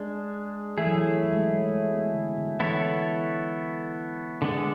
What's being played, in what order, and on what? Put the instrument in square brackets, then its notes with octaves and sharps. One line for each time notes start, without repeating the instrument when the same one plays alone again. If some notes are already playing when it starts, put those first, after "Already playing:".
Already playing: [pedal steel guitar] G#3 D4 G#4
[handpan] E3 [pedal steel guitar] A3 E4 G#4
[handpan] F#3
E3
F#3
G#3
F#3
G#3
B3
D3
D3
[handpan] E3 [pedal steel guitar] B3 E4 A4 C#5
[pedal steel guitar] D3 G#3 B3 D4 A4